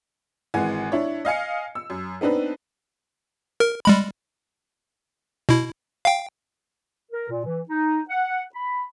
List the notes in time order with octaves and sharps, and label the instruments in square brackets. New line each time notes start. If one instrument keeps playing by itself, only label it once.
[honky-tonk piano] G#1 E3 G#3 F#5 G#5
D4 E4 C#5
D#5 F5 G#5 C#7
E6
F#2
B3 C4 D4 D#4 B4
[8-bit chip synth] A#4
G3 G#3 B5
B2 E4
F5 G5
[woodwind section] A#4
A#2
E3
D#4
F#5
B5